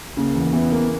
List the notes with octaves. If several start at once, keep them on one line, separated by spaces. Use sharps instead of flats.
C#3 A#3
E2
E3 B3
A#3